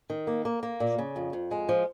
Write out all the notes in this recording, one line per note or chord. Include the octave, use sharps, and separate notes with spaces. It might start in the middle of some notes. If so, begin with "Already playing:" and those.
D#3
A#3
A#3
A#3
A#2
C#3
F2
F2
G#3
F3